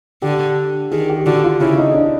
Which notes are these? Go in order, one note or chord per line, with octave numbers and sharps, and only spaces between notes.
D3 G4
D#3 G#4
G4
D3 F#4
F4
C#3 E4
D#4
D4